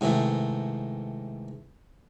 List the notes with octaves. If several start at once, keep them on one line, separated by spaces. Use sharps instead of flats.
G#2 C3 D#3 E3 A3